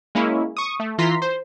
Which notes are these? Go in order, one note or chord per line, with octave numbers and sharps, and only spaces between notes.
G#3 A#3 C#4 E4
C#6 D#6
A3
E3 F4 A#5 C6 B6
C5